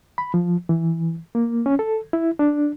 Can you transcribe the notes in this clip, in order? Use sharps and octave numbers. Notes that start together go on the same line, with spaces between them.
B5
F3
E3
A#3
C#4
A4
E4
D4